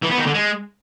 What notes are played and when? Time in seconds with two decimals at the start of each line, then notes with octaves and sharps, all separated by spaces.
0.03 E3
0.11 B3
0.19 D#3
0.26 D3
0.34 G#3